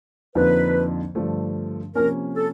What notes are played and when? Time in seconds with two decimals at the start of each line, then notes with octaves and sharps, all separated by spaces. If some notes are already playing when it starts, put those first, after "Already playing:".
0.35 F2 D3 F3 A#3 D#4 B4
1.15 G2 D3 F3 A3
1.95 C3 F3 A#3 C#4 A#4
2.35 A4